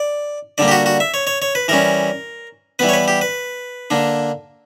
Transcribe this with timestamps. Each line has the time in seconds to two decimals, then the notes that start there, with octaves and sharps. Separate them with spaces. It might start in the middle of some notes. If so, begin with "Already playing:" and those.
Already playing: D5
0.58 D3 G3 A#3 D5
0.68 G4
0.71 F#4
0.86 F#4
1.00 E5
1.14 C#5
1.27 C#5
1.42 C#5
1.55 B4
1.68 E3 G3 C#4 A#4
2.79 E3 G3 B3 B4
2.89 C#5
2.93 B4
3.08 G4
3.21 B4
3.90 D3 A#3 D4